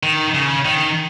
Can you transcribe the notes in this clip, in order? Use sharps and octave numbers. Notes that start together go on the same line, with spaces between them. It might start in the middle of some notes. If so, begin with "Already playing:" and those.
D#3
C#3
D#3